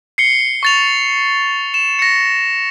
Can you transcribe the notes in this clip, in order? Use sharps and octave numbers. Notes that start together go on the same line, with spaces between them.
C7 C#7 G7
C#6 A6 F7
E7
A#6 C#7